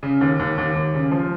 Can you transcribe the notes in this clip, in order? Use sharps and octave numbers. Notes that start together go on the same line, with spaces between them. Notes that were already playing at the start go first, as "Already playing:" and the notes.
C#3
D#2
D#2
D#2
D#2
C#3
F3